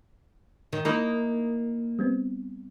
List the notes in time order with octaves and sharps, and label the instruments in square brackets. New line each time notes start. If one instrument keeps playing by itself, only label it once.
[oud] D#3
[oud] A#3 D#4 E4 [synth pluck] A#5 D#6
[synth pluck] G3 B3 C4